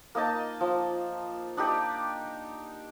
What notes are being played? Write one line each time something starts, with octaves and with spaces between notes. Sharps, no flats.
A#3 D#4 D#5 A5
F3
D4 D#4 G4 D5